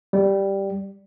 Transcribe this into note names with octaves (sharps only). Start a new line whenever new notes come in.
G3